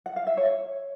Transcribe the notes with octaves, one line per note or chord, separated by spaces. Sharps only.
F#5
F5
E5
C#5